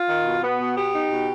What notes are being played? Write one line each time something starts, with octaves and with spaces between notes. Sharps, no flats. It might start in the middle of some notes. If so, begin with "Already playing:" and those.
Already playing: F4
D#3
B2
B3
B2
B3 G4
D#4
B2